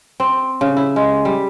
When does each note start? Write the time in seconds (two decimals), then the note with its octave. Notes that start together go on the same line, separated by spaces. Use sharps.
0.20 C4
0.61 C#3
0.77 E4
0.96 G#3
1.25 G3